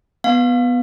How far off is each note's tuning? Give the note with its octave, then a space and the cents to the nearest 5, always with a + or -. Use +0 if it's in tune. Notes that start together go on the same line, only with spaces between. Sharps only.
B3 +0 F5 +20